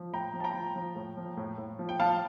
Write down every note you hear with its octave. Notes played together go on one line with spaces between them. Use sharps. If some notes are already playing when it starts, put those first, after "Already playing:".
Already playing: F3
A2 G5 A#5
F3
A5
G5 A#5
F3
F3
A2
F3
A2
A2
F3
G5
F3 F5 A5